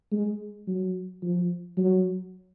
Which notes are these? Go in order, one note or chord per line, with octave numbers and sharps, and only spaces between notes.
G#3
F#3
F3
F#3